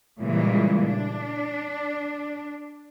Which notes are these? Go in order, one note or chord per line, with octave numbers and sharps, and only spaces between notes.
A#2 C#3 E3 G3 G#3
D4